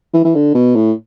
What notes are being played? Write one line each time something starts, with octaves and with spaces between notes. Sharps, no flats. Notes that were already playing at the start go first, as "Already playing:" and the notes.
E3
E3
D3
B2
A2